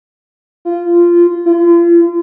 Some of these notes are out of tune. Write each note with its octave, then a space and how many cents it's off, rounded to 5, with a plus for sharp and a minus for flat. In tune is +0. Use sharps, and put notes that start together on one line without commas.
F4 -15
F4 -40